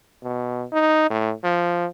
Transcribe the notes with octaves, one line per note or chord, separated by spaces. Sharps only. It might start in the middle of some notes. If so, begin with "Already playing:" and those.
B2
D#4
A2
F3